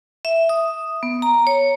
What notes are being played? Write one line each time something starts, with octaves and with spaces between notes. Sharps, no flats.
E5
D#6
B3
A#5
C#5